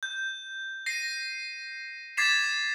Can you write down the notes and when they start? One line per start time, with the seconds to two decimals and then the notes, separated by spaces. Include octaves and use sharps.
0.03 G6
0.86 A#6 C7 D#7
2.17 D6 G#6 A6 B6 C7 E7